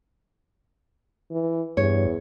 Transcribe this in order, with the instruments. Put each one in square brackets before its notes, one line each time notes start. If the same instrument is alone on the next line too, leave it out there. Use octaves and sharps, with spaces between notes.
[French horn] E3
[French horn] E2 [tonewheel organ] G2 [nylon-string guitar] C#5